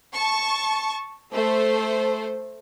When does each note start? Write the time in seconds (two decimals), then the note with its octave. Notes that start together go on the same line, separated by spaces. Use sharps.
0.14 A5 C#6
1.33 A3 C5